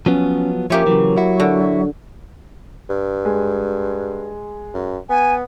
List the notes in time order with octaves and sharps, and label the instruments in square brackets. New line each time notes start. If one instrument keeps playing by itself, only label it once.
[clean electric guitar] F3 F#3 B3 [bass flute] C#4
[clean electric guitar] F3 C#4 [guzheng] A#3 G4 C#5 [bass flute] E5
[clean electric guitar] C#3 E3 [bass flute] F#3
[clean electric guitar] E4 F#4
[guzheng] D3
[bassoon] G2
[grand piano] G#3
[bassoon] F#2
[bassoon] B3 [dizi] G#5